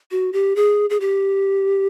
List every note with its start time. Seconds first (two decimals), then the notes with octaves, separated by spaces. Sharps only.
0.11 F#4
0.33 G4
0.56 G#4
0.90 G#4
1.00 G4